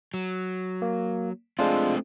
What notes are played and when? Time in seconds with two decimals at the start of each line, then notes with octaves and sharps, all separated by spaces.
0.14 F#3
0.82 A#3
1.59 G#3 A3 C4 D4 F4